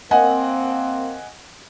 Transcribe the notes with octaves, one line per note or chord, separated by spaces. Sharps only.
A#3 C4 D#5 F#5 G#5